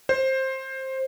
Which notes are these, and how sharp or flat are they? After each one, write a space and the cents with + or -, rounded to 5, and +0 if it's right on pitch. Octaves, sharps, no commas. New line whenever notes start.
C5 +15